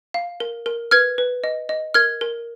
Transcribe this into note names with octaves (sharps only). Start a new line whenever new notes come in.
F5
A#4
A#4
B4 F6 G#6
B4
D#5
D#5
A#4 F6 G#6
A#4